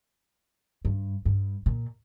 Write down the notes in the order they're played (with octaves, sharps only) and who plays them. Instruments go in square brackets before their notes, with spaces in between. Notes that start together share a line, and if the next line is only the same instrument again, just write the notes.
[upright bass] G2
G2
A#2